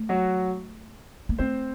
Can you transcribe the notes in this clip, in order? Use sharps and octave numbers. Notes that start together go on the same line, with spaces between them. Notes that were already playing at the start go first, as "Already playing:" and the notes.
Already playing: A3
F#3 F#4
A#3
A3 C4 C5